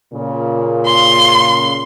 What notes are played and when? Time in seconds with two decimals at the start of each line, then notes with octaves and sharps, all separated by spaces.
0.13 A#2 C#3 A#3
0.86 C6